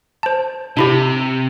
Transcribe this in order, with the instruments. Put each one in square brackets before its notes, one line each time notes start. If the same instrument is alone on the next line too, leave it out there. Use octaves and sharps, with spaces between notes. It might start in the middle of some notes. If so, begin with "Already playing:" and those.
[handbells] C5 A5
[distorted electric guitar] C3 [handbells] D4 E4 G4